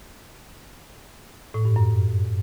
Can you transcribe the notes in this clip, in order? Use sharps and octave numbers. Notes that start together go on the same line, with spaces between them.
A2
G2
F#2